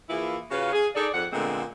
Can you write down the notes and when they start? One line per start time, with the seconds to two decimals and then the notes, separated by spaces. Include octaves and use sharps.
0.10 E3 A#3 E4 F4 G#4
0.51 C#3 F4 F#4 B4 C#5 F5
0.73 G#4
0.95 D#4 G#4 A4 D5
1.14 F2 F#5
1.33 A#2 D3 G#3 A3 B3 C4